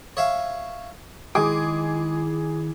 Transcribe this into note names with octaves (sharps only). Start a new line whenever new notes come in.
C#5 E5 F5
D#3 G#3 E4 G#4 G5 D6